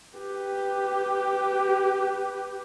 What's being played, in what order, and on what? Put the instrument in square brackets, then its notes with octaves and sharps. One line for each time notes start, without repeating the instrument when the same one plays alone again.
[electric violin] G4 B4